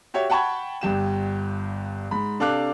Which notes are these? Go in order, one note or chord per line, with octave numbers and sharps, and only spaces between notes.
F#4 G4 C#5 E5
F#5 G5 A5 B5 C#6 G#6
G1 G2 G4 E7
G#2 B5
C3 D4 A4 F5 D6 F#6